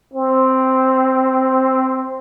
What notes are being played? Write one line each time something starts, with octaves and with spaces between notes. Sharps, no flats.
C4